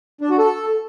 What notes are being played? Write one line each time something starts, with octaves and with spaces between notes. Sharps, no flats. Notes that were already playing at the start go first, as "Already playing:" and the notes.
D4
F#4
A4